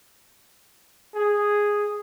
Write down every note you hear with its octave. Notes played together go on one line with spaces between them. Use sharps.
G#4